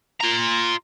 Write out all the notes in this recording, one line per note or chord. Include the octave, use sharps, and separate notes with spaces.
F4 A#5